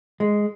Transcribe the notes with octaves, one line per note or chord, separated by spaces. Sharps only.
G#3